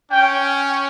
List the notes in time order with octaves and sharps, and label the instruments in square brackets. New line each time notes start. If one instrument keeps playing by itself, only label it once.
[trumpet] C#4 [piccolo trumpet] G5